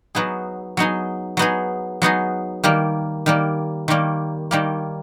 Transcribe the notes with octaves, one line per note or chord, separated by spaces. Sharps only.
F#3 B3 D#4 G#4
F#3 B3 D#4 G#4
F#3 B3 D#4 G#4
F#3 B3 D#4 G#4
D#3 G3 A#3
D#3 G3 A#3
D#3 G3 A#3
D#3 G3 A#3